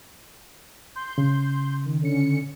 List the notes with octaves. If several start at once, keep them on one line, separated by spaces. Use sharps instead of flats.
C6 G6
C#3
D#3
D3 C#4 C#7